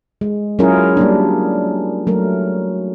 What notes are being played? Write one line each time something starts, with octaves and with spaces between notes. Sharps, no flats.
G#3
F#3 C#4 E4 F4 G#4 A#4
G3 A#3 D4
F#3 A3 A#4